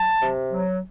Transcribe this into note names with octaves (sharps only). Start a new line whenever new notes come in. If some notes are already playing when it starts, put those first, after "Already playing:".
Already playing: F#3 A5
C3
F#3